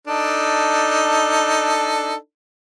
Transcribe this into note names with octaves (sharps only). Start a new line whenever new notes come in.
D4 D#4 A4